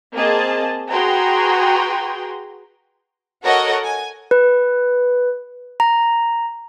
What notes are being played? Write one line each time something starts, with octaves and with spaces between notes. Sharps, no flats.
A#3 C4 G#4 D#5 A5
F#4 G#4 B4 G5 A#5 C6
F#4 A4 A#4 C#5 D#5 F#5
G#5
B4
A#5